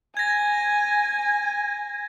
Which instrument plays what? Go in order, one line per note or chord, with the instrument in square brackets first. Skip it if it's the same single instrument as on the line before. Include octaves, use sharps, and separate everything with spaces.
[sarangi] G#5 [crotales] G#6 A#6